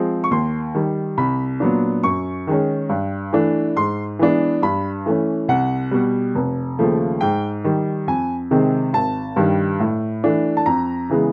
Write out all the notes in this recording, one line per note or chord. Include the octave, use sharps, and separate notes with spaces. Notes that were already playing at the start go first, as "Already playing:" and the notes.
Already playing: F3 G#3 C4
C#6
D#2 C6
D#3 G3
C2 B5
A#2 F#3 B3 D4
F#2 C#6
D#3 G#3 C#4
G2
E3 A3 D4
G#2 C6
E3 G#3 B3 D4
G2 B5
E3 A3 C#4
C2 F#5
B2 G3
F1
D#2 C#3 F3 A3
G#2 G5
D#3 G3
F2 G#5
C3 D#3 G#3 C4
G#1 A5
G2 D#3 G3
A2
E3 A3 D4
A5
F2 A#5
C#3 E3 G#3 B3